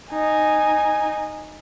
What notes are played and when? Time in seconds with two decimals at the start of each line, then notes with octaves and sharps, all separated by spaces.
0.11 D#4 G#5